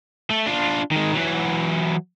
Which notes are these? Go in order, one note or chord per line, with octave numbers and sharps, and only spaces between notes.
A3
D4 F4
D#3 G#3
E3 F#3